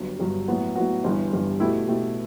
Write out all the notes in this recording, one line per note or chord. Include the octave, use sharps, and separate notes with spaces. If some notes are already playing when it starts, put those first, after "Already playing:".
Already playing: G1 G2 F#3
G1 G2 F#3
A2 F#3 B3 F#4
A2 F#3 B3 F#4
G1 G2 E3
G1 G2 E3
B2 A3 E4 G4
B2 A3 E4 G4